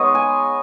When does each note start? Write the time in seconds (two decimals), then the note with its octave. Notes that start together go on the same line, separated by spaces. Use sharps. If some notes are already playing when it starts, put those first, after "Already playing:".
Already playing: G#3 B3 D#4 B4 C#5 D#5
0.15 G#5